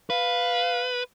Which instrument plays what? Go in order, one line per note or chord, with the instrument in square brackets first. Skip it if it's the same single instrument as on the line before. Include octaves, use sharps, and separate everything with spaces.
[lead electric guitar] B4 [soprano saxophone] F5